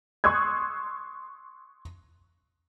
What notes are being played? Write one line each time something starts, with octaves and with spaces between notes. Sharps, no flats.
C6 C#6 D#6 E6 F#6 G#6